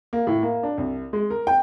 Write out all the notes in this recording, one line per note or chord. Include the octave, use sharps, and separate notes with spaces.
A#3
A2
A#3
D4
C2
G#3
A#4
G5